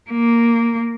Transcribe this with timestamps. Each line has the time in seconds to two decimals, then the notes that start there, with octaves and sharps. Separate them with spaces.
0.11 A#3